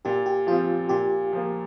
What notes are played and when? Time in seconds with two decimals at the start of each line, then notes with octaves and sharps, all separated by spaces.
0.05 A#2 G4
0.26 G4
0.47 F3 C4 F4
0.89 A#2 G4
1.33 F3 A#3